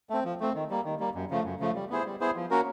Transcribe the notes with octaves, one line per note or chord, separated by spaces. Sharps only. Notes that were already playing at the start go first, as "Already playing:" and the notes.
A3 C4
F3
A3 C4
D#3
G3 A#3
D#3
G3 A#3
F#2
C#3 F3 A3
F#2
C#3 F3 A3
G3
B3 E4 G#4 C5
G3
B3 E4 G#4 C5
F3
A#3 C#4 F#4 A#4